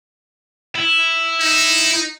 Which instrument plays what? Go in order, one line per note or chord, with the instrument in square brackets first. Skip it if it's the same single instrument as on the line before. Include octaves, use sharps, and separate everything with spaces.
[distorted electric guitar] E4
[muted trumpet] D#4